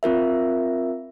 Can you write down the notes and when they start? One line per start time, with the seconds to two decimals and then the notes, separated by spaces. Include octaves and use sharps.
0.03 C4 F4 A#4 E5